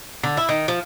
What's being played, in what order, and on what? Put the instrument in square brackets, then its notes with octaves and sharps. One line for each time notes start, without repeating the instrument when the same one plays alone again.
[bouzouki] D3
E4
D#3
F3